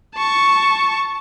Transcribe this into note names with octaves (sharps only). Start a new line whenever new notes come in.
A5 C#6